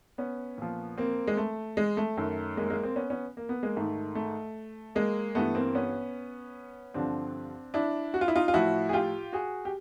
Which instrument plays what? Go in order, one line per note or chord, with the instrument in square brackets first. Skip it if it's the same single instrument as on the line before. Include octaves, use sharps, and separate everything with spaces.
[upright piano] B3 C#4
A#2 F3
A#3 C4
G#3
A3
G#3
A3
F#2 D#3
G#3 A#3
G#3 A#3
A#3 C4
B3 C#4
B3 C#4
A#3
B3
G#3 A#3
G#2 D#3 A3
A3
G#3 A#3
G2 E3 A3 B3
A#3 C4
B3 C#4
G2 D3 F3 C4 D4
D4 E4
F#4
F4
E4
D#4 F4
F4
A2 F3 E4 F#4
G#4
F4 G4
F#4 G#4
G4